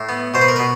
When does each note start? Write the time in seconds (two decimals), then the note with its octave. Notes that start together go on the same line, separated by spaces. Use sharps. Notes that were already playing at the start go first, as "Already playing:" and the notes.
Already playing: A2
0.09 B3
0.34 B2 C5
0.41 B4
0.48 A#4
0.56 B2 B4